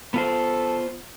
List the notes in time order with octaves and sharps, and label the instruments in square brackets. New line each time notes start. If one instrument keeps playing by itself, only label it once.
[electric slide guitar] B3 F4 C5 [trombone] A4